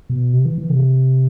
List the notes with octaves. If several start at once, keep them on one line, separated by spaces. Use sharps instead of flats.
B2
C3
E3
E3
C3